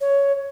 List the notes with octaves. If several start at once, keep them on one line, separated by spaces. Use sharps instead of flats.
C#5